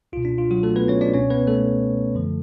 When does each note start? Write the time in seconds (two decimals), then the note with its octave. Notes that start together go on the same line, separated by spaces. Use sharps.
0.12 C#2 F4
0.17 B2
0.25 D4
0.38 F4
0.51 F#3 F#4
0.63 A3 A4
0.76 B3 B4
0.88 C#4 C#5
1.01 D4 D5
1.13 C#2 B2 C#4 C#5
1.30 B3 B4
1.47 A3 A4
2.15 F#2 D3 F3